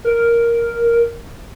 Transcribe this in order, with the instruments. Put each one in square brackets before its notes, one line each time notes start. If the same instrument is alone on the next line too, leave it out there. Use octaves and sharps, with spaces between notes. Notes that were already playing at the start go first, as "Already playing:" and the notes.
[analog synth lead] A#4